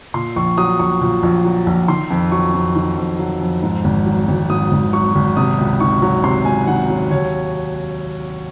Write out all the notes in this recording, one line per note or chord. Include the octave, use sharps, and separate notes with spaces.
A#2 C6
A#1 C#6
F#3 D#6
A#1 C#6
A#2
A#1
F#3
A#1
D#3 C6
F2
F#3 C#6
F2
D#3
F2
F#3
F2
G#2
G#1
F#3
G#1
G#2 D#6
G#1
F#3 C#6
G#1
C3 D#6
C#2
D#3 C#6
F#3
C3 C6
C#2 G#5
D#3 F#5
F#3
D#2 C#5